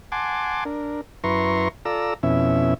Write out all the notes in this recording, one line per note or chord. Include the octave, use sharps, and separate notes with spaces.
F#5 G#5 A5 C6 D6
D4 A#4
F#2 E4 B4 A#5 C6 C#6
F4 A4 D5 A#5 E6
F2 B2 C#4 E4 E5